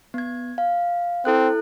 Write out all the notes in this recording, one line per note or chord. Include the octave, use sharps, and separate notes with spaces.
B3 G#6
F5
C4 E4 A4 F#6